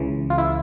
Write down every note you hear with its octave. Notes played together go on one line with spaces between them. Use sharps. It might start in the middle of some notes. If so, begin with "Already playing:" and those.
Already playing: C#2 C#3 E3
F4
E4